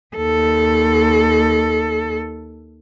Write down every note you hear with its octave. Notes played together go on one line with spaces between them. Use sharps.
D#2 A4